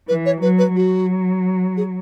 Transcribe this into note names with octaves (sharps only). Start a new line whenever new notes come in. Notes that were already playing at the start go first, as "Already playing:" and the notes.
E3 B4
C#5
F#3 B4
B4
F#3 F#4
G#4